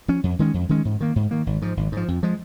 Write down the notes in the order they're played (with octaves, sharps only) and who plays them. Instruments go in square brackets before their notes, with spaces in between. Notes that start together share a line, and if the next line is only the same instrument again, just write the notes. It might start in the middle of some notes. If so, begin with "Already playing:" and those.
[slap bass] F3 C#4
F2
D#3 G#3 C#4
F2
D#3 G#3 C#4
G#2
D#3 A#3
G#2
D#3 A#3
G#1
G#2 F3
G#1
G#2 F3
F2
F3 G#3